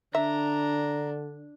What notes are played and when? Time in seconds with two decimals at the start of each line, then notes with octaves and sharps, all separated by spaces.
0.15 D3 D4 E5 A#5